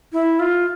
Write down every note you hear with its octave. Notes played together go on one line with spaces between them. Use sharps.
E4
F4